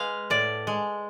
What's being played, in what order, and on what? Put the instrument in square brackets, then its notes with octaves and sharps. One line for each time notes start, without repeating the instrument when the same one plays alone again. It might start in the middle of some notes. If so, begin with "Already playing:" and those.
Already playing: [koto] G#3 B4 F5
A2 D5
G#3